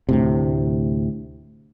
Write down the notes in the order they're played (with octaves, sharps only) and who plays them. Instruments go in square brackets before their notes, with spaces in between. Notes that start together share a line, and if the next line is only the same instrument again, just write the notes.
[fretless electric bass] D2 A2 C3